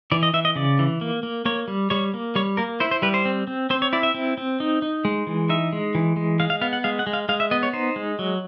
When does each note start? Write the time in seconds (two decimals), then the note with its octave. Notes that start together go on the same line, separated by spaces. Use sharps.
0.12 E3 D5
0.23 D#5
0.34 E3 E5
0.45 D#5
0.56 C#3 D5
0.79 E3
1.01 A#3
1.23 A#3
1.45 A#3 C#5
1.68 G3
1.90 G3 C#5
2.14 A#3
2.35 G3 C#5
2.57 A#3 A#4
2.80 E4 C5
2.91 C5
3.02 G3 B4
3.14 C5
3.25 C4
3.47 C4
3.70 C4 C5
3.82 C#5
3.93 E4 D5
4.03 E5
4.15 C4
4.38 C4
4.60 D#4
4.82 D#4
5.05 G#3
5.27 E3
5.49 D#4 E5
5.73 G#3
5.95 E3
6.16 G#3
6.40 G#3 F5
6.50 F5
6.61 B3 F5
6.73 F#5
6.84 G#3 F5
6.99 F#5
7.07 G#3
7.13 F5
7.29 G#3 F5
7.40 E5
7.51 B3 D#5
7.63 C#5
7.73 D#4 C5
7.96 G#3
8.19 F#3